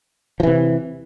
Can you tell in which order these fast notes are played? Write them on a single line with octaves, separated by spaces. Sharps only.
F3 E3 C3